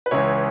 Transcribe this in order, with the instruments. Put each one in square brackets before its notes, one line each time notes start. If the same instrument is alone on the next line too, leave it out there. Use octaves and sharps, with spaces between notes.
[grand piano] B4
C#2 C#3 E3 C#5